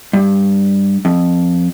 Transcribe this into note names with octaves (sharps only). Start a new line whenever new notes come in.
G2
F2